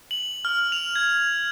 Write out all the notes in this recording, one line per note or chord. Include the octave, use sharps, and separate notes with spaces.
F#7
F6
F7
G#6